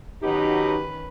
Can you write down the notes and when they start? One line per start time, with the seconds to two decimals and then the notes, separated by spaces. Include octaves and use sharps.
0.23 B2 D#3 F#3 C#4 D#4 G4 B4